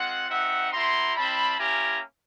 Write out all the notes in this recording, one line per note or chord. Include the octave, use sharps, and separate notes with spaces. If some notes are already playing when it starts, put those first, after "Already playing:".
Already playing: G#3 C4 F4 F#5
C4 D#4 F#4 E5 F#5
B3 E4 G4 A#5 C6
G3 C4 E4 A5 B5
A#3 C#4 E4 G4 G#5 A#5